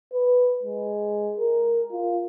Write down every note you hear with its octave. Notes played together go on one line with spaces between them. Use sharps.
B4
G#3
A#4
F4